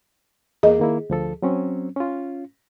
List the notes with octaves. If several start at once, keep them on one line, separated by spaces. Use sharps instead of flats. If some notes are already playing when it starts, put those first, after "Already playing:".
E2 A#3 G#4 D#5
D#3 A#3 E4
D2 F3 A4
F#3 C4 C#4
C#4 F4